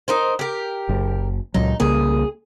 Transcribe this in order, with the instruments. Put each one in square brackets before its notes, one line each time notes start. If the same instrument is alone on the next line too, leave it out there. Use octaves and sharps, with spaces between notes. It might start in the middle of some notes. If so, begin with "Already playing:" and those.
[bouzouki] D#4 A#4 C5
G4 A#4
[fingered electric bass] F#1
[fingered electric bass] C#2 A#2 F#3 [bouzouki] D#4
[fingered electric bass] C2 C#3 A#3 [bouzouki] G#4